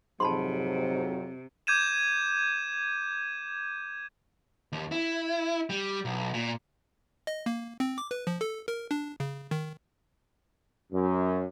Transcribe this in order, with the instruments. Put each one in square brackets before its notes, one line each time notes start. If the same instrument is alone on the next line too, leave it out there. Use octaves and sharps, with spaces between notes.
[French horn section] F2 F#3 [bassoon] G#2 [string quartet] C3 [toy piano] A5 B5 C6
[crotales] D6 G6 G#6 D#7 E7
[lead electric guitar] D#2
E4
G3
B1
A#2
[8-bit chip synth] D#5
A#3
C4
D6
B4
F3
A4
A#4
D4
C#3
D#3
[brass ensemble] F#2